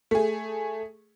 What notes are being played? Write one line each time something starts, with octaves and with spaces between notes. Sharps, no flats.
A3 G#4